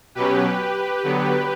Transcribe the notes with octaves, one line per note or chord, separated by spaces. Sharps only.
B2 F#3 C#4 G4 B4
D3 F#3 B3